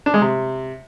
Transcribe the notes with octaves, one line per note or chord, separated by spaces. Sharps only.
D4
G#3
C3